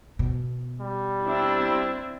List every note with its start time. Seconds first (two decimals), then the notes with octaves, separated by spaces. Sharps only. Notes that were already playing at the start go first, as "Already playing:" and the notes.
0.19 B2
0.81 G3
1.27 C4 D4 E4